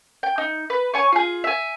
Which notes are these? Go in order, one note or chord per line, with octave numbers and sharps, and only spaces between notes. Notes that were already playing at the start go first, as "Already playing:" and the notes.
G5
D#4
B4
C#5 G#5 C#6
F4 G#4
E5 G#5